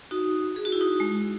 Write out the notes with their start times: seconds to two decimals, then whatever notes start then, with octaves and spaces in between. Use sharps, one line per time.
0.11 D#4 F#4
0.56 G#4
0.65 F#4
0.72 E4
0.81 D#4 F#4
1.00 G#3